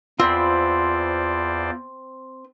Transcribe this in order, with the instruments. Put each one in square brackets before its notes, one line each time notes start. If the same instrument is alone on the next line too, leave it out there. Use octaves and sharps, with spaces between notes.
[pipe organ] E2 C5 D5 [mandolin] C4 [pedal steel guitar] F4 B5